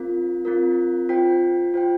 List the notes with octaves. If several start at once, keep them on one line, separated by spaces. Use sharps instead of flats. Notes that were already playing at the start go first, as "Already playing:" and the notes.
Already playing: C4 F4 A#4
C4 F4 A#4
F4 C5 G5
F4 C5 G5